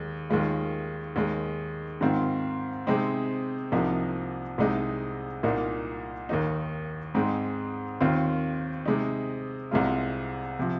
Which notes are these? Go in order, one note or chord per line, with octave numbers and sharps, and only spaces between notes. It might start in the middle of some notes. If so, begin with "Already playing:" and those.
Already playing: D#2 G#3
D#2 D#3 G#3 F4
D#2 D#3 G#3
G#2 D#3 C4 F4
C3 G#3 C4 D#4
C2 C3 F3 A#3 D#4
C2 C3 G#3 D#4
C2 A#2 A#3 D#4
D#2 D#3 A#3 D#4
G#2 G#3 C4 D#4
D#2 D#3 C4 F4
C3 G#3 D#4
C2 C3 G#3 F4
C3 F3